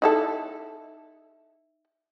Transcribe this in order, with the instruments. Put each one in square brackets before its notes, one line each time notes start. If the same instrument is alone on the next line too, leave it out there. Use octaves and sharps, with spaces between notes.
[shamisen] D#4 E4 A4